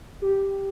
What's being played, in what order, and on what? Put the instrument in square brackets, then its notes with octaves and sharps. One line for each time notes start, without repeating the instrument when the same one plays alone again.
[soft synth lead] G4